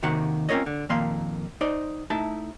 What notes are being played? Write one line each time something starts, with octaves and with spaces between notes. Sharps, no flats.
D#2 C3 D#3 F#4 F#5
C4 C#4 F4 A#4 C#5 D#5
D3
F2 A#2 D#3 A#3 F5 C6
D#4 C5 D5
A3 D#4 E4 E5 A5